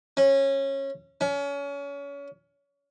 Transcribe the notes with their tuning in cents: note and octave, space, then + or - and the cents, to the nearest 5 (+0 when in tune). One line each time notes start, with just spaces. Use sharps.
C#4 -20
C#4 +30